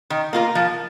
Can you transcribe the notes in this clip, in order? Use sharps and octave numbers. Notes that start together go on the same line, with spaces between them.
D#3
A#3 F4 A#4
F3